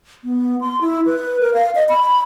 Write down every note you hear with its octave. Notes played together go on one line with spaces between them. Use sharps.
B3
C6
E4
B4
A#4
F5
D#5
B5